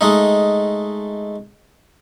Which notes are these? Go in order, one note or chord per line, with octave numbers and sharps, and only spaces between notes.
G#3 A3 D#4